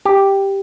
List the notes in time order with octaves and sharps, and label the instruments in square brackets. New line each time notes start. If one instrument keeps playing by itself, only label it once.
[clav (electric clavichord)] G4